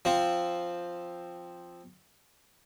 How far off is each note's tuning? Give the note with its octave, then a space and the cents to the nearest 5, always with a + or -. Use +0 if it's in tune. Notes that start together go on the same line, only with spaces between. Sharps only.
F3 +0 C4 +0